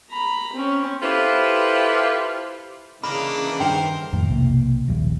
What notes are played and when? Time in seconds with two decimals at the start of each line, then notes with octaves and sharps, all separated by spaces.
0.10 A#5 B5
0.53 C4 C#4
1.02 E4 F4 G4 A4 B4 C5
3.04 C#3 E3 A#3 D4 D#4 B5
3.60 G2 D#3 A#4 C5 G5
4.13 F2 A2 D#3
4.28 B1 C3 A#3
4.88 D#1 A#1 D#2 G3